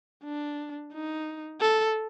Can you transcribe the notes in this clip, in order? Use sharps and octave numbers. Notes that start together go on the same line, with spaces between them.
D4
D#4
A4